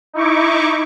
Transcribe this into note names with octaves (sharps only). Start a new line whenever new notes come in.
D#4 E4 C#6 D6